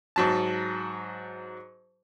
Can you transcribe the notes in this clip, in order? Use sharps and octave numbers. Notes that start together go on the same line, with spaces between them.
G#2 F#3 A5